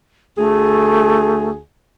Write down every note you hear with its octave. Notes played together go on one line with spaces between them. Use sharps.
D2 A3 G#4